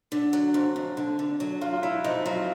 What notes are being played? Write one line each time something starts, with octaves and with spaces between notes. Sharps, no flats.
D3
F#3
F2
F2
D3
D3
F#3
F#3 F4
F4
F#3 E4
F2 D#4
F#3 F4